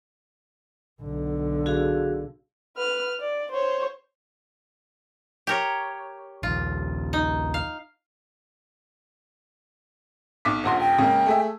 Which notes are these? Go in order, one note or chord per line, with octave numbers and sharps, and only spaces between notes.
B1 D3
F#4 G#4 F5
B4 F6
D5
C5 C#5
G4 A#4 C#5
A#1 D#2 F4
D#4
F5
B1 D6 B6
D#1 A#1 F#5 C6
G5
C#3 G#3 A#3
A3 G#4 E5